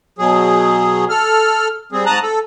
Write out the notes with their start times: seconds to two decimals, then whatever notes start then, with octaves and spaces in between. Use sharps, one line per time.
0.18 B2 F#3 G#4
1.09 A4 F6
1.92 G3 C4 G#4
2.06 G#2 A5 A#5 D#6 F#6
2.23 A4